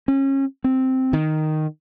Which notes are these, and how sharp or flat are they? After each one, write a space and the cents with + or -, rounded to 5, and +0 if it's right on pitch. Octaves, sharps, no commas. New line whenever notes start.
C#4 -30
C4 -5
D#3 -5